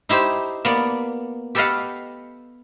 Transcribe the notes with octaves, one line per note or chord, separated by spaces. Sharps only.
D#4 E4 G4 C5
A#3 B3 D5
G4 A4 B4 D#5 F5 F#5